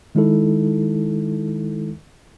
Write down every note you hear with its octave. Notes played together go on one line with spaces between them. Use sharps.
D#3 G#3 D#4 E4 A4